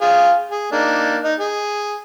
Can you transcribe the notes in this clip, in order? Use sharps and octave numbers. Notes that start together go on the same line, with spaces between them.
F4 G#4
G#4
A#3 D4 D#4
D#4
G#4